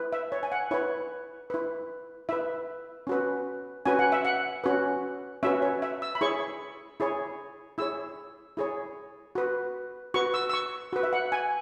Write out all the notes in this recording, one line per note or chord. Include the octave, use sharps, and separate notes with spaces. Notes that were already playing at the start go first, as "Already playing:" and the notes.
Already playing: E4 B4
E5
C#5
G#5
F#5
E4 B4 C#5
E4 B4
E4 B4 E5
C#4 F#4 B4
C#4 F#4 B4 G#5
F#5
E5
F#5
C#4 F#4 B4
C#4 F#4 B4 E5
C#5
E5
E6
B5
E4 G#4 C#5 C#6
E4 G#4 C#5
E4 G#4 C#5 E6
E4 G#4 C#5
F#4 B4
F#4 B4 C#6
E6
E6
C#6
F#4 B4
E5
F#5
G#5